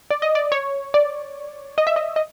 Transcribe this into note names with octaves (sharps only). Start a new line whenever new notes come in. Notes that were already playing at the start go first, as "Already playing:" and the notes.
D5
D#5
D5
C#5
D5
D#5
E5
D#5
D#5